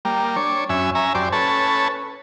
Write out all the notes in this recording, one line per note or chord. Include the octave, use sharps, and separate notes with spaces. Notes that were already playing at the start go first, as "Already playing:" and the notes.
G3 A#3
D4 C#5
F#2 C#4 E5 G#5
C#4 E5 G#5 A#5
F#2 G4 C5 D5
C#4 A4 B4 C#5 A5